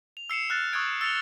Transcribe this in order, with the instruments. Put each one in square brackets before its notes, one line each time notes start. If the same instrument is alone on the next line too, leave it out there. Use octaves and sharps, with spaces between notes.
[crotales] F7
E6 C7 C#7 E7
F6 F#6 A6
C#6 D#6 E6 F#6 G#6 D7
E6 A6 C7 C#7 F7 G7